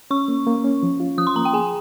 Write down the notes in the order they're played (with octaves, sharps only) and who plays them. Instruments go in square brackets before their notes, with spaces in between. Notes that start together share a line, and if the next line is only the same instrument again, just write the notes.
[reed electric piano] C#4 [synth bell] C#6
[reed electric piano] A#3
A#3
C#4
F3
F4
[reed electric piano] F3 [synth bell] D#6
[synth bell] C6
[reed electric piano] A#3 [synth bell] A#5
[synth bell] G5
[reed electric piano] G#4 [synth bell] G#5